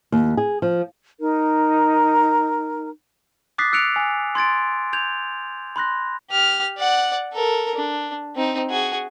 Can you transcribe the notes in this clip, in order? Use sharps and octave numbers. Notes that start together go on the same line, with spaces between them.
D#2
G#4
F3
D#4 A#4
D6 D#6 F#6 A6 B6 C7
E6 F#6 C#7 D7 F7
G#5
C6 G#6 A6 D7
G6 G#6 F7
B5 C6 F#6 A#6
G4 F6
D5 F#5
A4 A#4
D4
C4 D#4
F#4 G#4